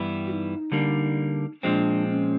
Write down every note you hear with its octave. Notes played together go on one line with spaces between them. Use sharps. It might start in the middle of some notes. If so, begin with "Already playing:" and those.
Already playing: G2 E3 G3 B3 E4
F#4
D#4
D3 G3 A#3
A#2 F3 G#3 C4 D4
C#4